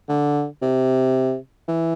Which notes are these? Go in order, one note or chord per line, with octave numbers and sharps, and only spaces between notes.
D3
C3
E3